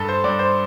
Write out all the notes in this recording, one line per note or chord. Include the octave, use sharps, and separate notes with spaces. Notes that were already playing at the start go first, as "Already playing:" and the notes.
Already playing: G2 A4
C5
G2 D5
C5